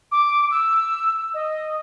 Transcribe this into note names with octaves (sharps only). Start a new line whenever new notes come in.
D6
E6
D#5